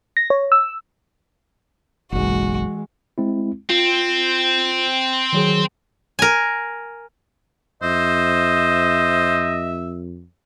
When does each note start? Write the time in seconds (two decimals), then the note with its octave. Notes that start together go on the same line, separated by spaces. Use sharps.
0.17 A#6
0.30 C#5
0.52 E6
2.12 F#1 B1 E3 G#3 F#4
3.18 G#3 C4 E4
3.70 C4 F4
5.33 D#3 F#3 G#4
6.19 A#4 G#5
7.82 F2 C5 D#5 E5